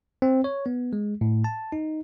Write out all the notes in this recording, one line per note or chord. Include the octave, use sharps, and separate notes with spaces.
C4
C#5
B3
G#3
A2
A5
D#4